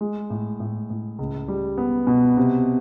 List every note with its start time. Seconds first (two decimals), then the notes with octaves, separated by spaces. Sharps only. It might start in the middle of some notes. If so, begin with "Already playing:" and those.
0.01 G#3
0.30 A2
0.60 A2
0.90 A2
1.19 C#2
1.48 G3
1.78 B3
2.07 B2
2.37 C3